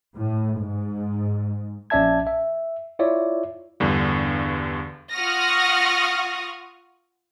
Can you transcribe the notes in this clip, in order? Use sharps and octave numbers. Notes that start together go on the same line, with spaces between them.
A2
G#2
A#1 C#4 D5 E5 A5 G#6
E5
E4 F4 C#5 D5 E5
E2 G2 D3
F4 F#5 C#6 D#6 F6 A#6